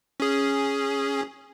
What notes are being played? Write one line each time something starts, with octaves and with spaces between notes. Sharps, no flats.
C#4 G#4